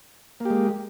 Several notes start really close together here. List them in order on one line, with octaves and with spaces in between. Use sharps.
A#3 G4 G#3